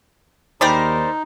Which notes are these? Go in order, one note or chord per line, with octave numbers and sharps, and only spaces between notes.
D#2 D#4 G4 G#4 A#4 C5 D5 B5